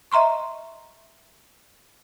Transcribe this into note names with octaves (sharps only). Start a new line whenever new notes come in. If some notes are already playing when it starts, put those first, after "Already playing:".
D#5 E5 A#5 C6 C#6